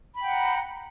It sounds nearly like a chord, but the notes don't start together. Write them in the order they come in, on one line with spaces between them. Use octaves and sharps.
B5 G5 F#5 A#5